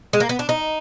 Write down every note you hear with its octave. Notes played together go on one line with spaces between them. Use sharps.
G#3
A#3
B3
D4
D#4